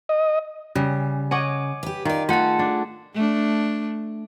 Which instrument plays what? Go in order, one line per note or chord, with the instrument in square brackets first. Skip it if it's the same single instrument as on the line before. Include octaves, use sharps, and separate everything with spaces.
[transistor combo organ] D#5
[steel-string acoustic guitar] C#3 [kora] G3 [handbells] C#4
[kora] C#5 D#5 F#5 [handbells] G#5 D6
[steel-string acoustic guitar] G4 B4
[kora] D#3 [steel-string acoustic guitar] F4 D5
[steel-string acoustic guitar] A3 G#4 [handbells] F4 F#5 A5
[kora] D4
[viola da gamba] A3 D4